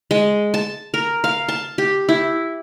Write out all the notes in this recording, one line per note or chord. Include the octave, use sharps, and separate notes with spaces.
G#3
A5
A#4
F5
A5
G4
E4